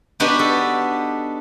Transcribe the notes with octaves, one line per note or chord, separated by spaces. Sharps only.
B3 D4 D#4 F#4 G4
A4